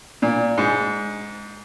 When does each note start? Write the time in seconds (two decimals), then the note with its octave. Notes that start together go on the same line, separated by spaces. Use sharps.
0.22 A#2
0.58 G#2